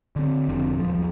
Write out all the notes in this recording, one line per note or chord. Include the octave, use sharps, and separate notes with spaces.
D3 C4
F1 F2 D3 C4
D#1 F3
D#2 F3